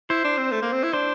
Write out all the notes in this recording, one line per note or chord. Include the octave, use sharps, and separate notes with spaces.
E4 C5
D4
C4
A3
A#3
C4
E4
D4 C5